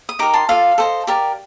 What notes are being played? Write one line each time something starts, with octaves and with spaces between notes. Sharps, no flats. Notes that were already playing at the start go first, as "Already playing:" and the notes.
D#6
D#4 G4 A#4 A#5 D6
A5 C6
F4 A4 D5 F5
A4 C5 D#5
G4 A#4 D5